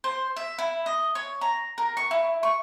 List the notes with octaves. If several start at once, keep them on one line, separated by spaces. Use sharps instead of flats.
C5
E5
E4
D#5
C#5
A#5
A#4
C#6
E4
C#6